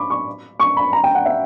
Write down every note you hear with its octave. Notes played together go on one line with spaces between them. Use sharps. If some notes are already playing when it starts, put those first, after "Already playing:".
Already playing: B5 C#6 D6
C#6
C#6
B5
A#5
G5
F#5
E5